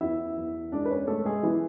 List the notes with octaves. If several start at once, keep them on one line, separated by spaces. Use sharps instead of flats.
E2 E4 E5
E2
G#3 D4 D5
B4
C#4 C#5
G#3 A3 A4
G#3 G#4
E3 B3 E4